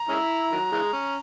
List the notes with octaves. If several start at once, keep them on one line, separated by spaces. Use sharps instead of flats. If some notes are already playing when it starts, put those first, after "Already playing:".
Already playing: A#5
G#3 C#4 E4
D#3 F#3
C#3 E3 G#3
C#4